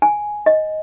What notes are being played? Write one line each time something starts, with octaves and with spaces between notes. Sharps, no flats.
G#5
D#5